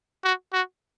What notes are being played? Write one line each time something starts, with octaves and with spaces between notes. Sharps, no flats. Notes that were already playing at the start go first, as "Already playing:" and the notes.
F#4
F#4